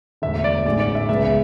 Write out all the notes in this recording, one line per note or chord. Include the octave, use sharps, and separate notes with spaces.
E1 D2 D3 E5
D5
A1 G#2 G#3 D5
D5
E5
C#2 C#3 G#3 B3 E5